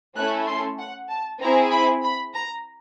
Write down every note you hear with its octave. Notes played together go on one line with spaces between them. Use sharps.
A3 C#4 E4 A4 F#6
C6
F#5
A5
C4 E4 G#4 A#5
B5
B5
A#5